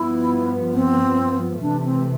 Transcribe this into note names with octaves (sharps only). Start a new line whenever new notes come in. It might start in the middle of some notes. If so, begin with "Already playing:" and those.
Already playing: G2 F3 B3 E4
C4
C3 E3 A3 D4
C4